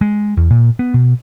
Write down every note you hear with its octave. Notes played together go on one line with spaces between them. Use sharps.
G#3
E2
A#2
B3
B2